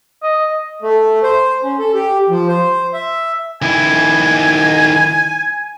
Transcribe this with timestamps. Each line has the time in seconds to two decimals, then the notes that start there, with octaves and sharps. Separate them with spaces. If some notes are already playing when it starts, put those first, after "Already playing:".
0.23 D#5
0.82 A3
1.23 C5
1.64 C#4
1.79 A4
1.94 G4
2.29 F3
2.48 C5
2.94 E5
3.62 D#3 E4 G#5